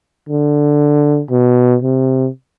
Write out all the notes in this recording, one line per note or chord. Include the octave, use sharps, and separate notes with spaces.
D3
B2
C3